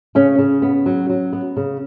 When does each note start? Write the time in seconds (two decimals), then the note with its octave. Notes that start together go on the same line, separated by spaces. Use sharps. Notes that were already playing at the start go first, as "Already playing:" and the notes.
0.15 C#3 C#4
0.38 C#3
0.62 B3
0.86 F#3
1.10 F#3
1.33 B3
1.57 C#3